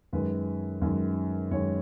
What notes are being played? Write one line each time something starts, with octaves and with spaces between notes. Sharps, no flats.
F#2 D#3 G#3 B4
F#2 D#3 G#3
F#2 D#3 G#3 C#5